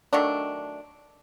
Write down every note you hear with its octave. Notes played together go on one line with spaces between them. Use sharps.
D#3 F#3 A3 D4